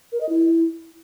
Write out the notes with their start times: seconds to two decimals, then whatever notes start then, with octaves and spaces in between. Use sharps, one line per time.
0.12 A#4
0.21 D#5
0.29 E4